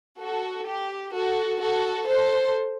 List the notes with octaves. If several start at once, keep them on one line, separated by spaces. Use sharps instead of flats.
F#4 A4
G4
F#4 A4
F#4 A4
A4 C5